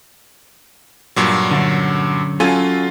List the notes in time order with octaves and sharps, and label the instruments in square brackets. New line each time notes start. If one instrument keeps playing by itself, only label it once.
[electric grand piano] G2 A#2 F#3
[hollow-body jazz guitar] F#2 D3
[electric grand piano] F#3 F4 [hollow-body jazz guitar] C#4 A4 G#5